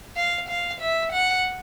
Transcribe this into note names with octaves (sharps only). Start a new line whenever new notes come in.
F5
F5
E5
F#5